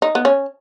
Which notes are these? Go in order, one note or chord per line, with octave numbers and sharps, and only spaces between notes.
D#4
B3
C#4